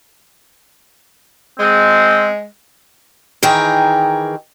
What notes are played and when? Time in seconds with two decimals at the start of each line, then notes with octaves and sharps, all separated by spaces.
1.60 G#3 C4
3.43 D#3 E3 G#4 A#4 G5